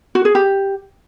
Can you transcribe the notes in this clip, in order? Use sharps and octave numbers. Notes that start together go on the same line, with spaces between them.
F#4
G#4
G4